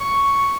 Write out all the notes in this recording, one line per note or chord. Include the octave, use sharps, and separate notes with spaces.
C#6